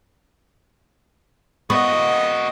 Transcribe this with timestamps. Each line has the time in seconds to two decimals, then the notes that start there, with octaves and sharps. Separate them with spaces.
1.70 A#3 B3 F#4 D#5